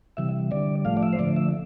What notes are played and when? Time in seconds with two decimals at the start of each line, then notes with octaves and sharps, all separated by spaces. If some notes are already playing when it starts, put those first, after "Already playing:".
0.17 C3 E3 G3 E5
0.51 D3 G3 D5
0.85 A2 F3 A3 F5
0.97 D5
1.03 E5
1.13 C5
1.19 D3 F3 A3 D5
1.36 E5